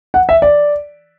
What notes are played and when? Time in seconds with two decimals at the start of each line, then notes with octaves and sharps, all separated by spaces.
0.14 F#5
0.29 E5
0.42 D5